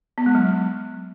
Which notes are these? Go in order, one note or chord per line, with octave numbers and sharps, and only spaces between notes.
B3
G#3
F#3